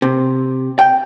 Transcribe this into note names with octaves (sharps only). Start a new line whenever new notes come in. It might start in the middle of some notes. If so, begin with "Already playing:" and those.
C3
G5